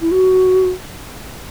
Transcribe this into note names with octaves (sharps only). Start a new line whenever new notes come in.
E4
F#4